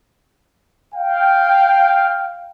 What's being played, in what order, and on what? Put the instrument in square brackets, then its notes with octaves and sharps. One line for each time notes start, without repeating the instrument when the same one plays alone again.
[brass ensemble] F5 G5